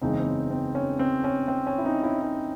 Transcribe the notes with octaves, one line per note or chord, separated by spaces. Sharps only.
F#1 E2 C#3 E3 G#3 C4 D#4
C4
C#4
C4
C#4
C4
C#4
C4
C#4
E4
C4 D#4
C#4 E4
C#4 E4